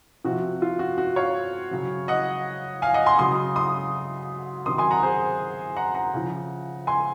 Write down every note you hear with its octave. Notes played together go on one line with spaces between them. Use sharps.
C3 F3 F#4
F4
F#4
F#4
C#5 F5
C#3 F#3
D#5 F#5
F5 G#5
D#5 F#5
G#5 C6
C#3 F#3 C6 D#6
C6 D#6
C3 D#3 F#3 C6 D#6
G#5 C6
F#5 A#5
G#4 C5
F#5 A#5
F#5 A#5
C#3 F3
G#5 C6